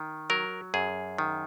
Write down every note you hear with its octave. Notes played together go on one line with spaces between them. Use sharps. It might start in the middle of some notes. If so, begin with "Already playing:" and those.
Already playing: D#3
F#3 A#4
F#2 G#4
D#3